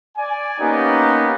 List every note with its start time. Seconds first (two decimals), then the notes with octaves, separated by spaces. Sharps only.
0.18 D5 G#5
0.59 A#3 B3 C#4 D#4 G4